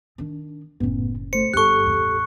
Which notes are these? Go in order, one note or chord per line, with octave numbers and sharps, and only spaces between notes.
D#3 D4
F#1 A2 B3 C#4
A3 C5 C#7
G1 G2 G4 A4 C#6 F#6
A1 E2